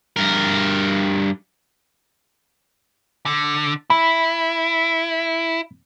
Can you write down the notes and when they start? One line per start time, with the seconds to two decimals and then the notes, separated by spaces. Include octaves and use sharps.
0.16 G2 A#4
3.26 D3
3.90 E4 B5